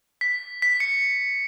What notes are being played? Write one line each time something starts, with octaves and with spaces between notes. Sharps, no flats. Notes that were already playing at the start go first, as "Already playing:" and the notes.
B6
B6
C#7